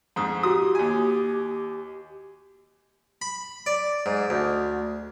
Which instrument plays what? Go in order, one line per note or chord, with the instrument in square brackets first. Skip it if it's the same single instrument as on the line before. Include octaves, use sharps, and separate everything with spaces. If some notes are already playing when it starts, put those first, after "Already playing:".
[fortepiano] F2 G#2 [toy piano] A#5 D#6
[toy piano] E4 F#4 A#5 [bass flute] G4 [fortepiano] D#6
[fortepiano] D#2 G#5
[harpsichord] B5
D5
G#2
D2